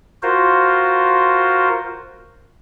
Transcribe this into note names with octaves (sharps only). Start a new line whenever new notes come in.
F4 F#4 A#4 C5